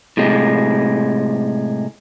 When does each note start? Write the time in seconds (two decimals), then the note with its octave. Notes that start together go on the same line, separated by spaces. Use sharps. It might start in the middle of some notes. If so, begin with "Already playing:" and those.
0.17 A2 C3 G#3